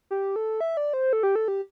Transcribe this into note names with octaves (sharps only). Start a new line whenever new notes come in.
G4
A4
E5
D5
C5
A4
G4
A4
G4